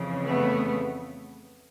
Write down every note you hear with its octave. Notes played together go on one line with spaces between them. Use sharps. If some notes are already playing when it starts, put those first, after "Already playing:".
Already playing: F2 C#3 E3
A3 B3